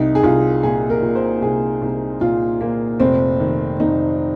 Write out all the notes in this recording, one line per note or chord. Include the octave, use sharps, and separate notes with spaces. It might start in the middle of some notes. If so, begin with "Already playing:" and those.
Already playing: C2 D#4
G#4
C2 F4
A#2 G#4
A#4
A#2
C5
C2 G#4
C2
A#2 F4
A#2 A#3
F1 C4
D#3
F1 D#4